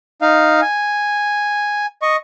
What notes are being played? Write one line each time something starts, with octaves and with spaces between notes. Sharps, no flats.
D#4 F5
G#5
D#5 C#6